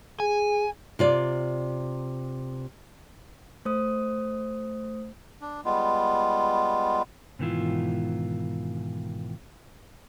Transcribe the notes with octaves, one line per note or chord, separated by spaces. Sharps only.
G#4 G#5
C3 F4 D5
A3 C5 D#6
D4
G3 G#3 B3 F4
G#2 B2 D#3 E3 E4 F4